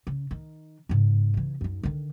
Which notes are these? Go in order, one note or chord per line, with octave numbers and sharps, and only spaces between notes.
C#3
D#3
G#2 C#3
C#3 E3
F#2 D#4
D3 D#3